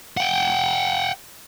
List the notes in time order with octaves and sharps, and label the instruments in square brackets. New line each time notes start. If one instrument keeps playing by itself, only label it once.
[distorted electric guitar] F#5 G5